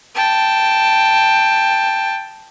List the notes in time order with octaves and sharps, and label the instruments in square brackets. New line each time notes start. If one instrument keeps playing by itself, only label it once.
[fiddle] G5 A5